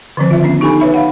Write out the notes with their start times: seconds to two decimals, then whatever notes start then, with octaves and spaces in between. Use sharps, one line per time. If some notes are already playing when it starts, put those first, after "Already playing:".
0.17 D3 D#3 F3 C4 C5
0.31 F4 E5
0.43 B3 C#4 D4
0.61 D#4 G4 A4 G#5 B5
0.80 B4 C#5 E5 B5
0.94 F5 F#5